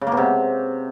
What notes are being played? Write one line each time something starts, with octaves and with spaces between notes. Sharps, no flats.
C#3
A#3
B2
C3